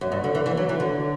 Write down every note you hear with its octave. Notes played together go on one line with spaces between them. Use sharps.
F#2
G2
D3
E3
E3
F#3
E3
D3